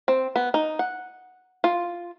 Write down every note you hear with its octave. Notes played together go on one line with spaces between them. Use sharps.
C4
B3
D#4
F#5
F4